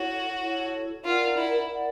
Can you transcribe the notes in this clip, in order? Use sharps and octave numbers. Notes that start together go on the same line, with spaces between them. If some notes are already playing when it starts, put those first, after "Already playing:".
Already playing: E4 F#4 A4 C#5
E4 A4 C#5
F4 A#4 D5 F#5
E4
A#4 D5 F#5